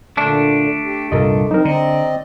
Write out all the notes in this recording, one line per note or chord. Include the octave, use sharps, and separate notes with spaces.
A#2 D3 A3 D4
G4
C2 G2 A#2 F4 A4 A#4 D#5
F#3 C4 D#4 A#4
D3 C4 D5 D#5 A#5